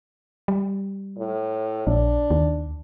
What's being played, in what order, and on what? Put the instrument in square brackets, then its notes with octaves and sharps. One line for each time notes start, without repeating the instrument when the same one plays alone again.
[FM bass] G3
[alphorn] A2
[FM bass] A#1 [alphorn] D4
[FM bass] D#2